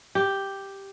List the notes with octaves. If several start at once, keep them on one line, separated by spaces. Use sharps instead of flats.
G4